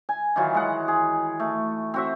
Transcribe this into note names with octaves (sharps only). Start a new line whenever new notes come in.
G#5
D#3 E3 F#3 F4
G#3 F#5
G#4
A3
C4 F#4 E5